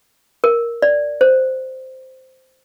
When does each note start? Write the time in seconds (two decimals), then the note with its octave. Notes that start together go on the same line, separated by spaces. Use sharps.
0.44 A#4
0.82 D5
1.21 C5